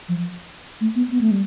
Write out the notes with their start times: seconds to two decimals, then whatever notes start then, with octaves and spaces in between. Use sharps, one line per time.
0.09 F3
0.81 A3
0.96 B3
1.11 B3
1.21 A3
1.31 G3